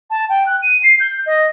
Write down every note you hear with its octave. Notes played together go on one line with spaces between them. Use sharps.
A5
G5
F#6
D#7
C7
G6
D#5